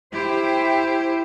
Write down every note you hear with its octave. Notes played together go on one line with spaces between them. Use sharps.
E4 G4 C5